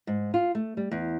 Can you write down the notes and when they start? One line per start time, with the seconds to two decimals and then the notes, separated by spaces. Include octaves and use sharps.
0.07 G#2
0.34 F4
0.55 A3
0.77 G3
0.91 E2